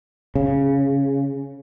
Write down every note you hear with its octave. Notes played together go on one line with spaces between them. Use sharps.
C#3